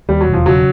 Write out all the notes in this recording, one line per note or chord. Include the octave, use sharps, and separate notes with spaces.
D#2 G3
F#3
E1
F3
C#3 F#3